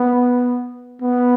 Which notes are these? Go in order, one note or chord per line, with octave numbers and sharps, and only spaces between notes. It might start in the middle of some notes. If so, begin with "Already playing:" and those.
Already playing: B3
B3